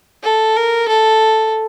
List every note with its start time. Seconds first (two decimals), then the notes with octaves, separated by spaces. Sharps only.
0.23 A4
0.57 A#4
0.88 A4